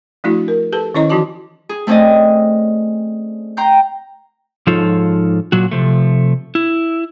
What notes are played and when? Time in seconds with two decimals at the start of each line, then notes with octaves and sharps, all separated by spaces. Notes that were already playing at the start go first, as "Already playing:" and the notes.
0.24 F3 A3 D4 E4 F#4
0.48 A#4
0.72 G4 A4 B4 A5
0.95 D#3 C#4 E4 C#5 D#5 A#5
1.10 E3 F3 D#4 F#4 A5 D6
1.69 G#4
1.87 A3 C4 C#4 G#4 D5 D#5
3.57 G5 A#5 C6 G6
4.67 G#2 F3 D#4 F4 A4 C#5
5.52 A#2 F#3 F#4
5.72 C3 F3 A3
6.55 E4